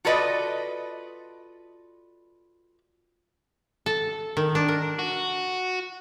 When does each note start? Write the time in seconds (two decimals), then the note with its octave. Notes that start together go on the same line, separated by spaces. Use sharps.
0.05 F4 F#4 A4 B4 D5 D#5
3.86 A4
4.37 D#3
4.55 D4
4.68 A#4
4.99 F#4